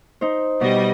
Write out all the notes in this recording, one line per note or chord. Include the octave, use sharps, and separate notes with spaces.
D#4 C5
B2 G3 D#5